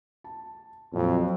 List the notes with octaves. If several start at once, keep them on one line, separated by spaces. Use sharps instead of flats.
A5
F2 A#2 F#3